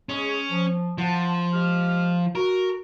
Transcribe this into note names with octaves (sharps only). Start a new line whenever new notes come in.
G#3 C#4 G#4
F3
F3 F#5 A5
G#3 G4 F6
F#4 A#4